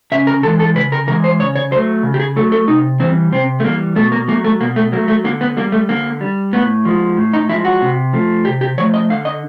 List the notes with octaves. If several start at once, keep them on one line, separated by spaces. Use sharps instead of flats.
C#3 E5
A#4
E3 G#3 A4
A4
C#3 B4
A#4
E3 G#3 A#4
C5
C#3 C#5
C#5
F#3 A3 C5
C#3
G4
G#4
F#3 A3 A4
A4
C3 D#4
E3 G3 C4
C3 C4
A3
E3 G3 A#3
B2 A3
A#3
F#3 A3 A#3
A3
B2 A#3
A3
F#3 A3 A#3
A3
D3 A#3
B3
G3 A#3
A3
D3 A#3
G3
A2 B3
F3 G#3
A2
D#4
F3 G#3 E4
F#4
C3
F3 A3
C3 G4
G4
F3 A3 C#5
D#5
D3 F5
D#5